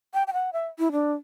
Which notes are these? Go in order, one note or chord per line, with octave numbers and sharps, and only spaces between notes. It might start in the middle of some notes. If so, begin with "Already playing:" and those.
G5
G5
F#5
E5
E4
D4